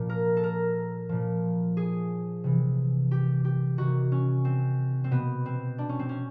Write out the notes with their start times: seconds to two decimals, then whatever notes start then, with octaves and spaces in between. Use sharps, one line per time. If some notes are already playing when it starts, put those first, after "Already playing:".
Already playing: A#2 F3
0.09 A#4
0.37 A4
0.43 A#4
1.09 A#2 F3
1.77 G#4
2.44 C3 E3
3.11 G4
3.45 G4
3.78 C3 D#3 F#4
4.12 C#4
4.45 C4
5.04 C4
5.11 B2 B3
5.46 C4
5.78 D4
5.89 C#4
5.99 C4
6.09 C#4